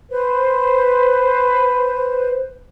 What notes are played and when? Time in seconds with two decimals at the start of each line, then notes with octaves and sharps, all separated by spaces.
0.10 B4 C5